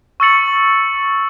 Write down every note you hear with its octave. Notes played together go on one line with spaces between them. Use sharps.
C#6 E6 A6 C#7 F#7